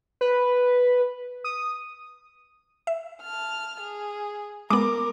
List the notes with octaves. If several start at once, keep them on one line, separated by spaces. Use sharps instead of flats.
B4
D#6
E5
A5 F6
G#4
G#3 B3 A#4 D6